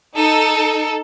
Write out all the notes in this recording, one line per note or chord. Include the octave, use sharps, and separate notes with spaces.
D#4 A4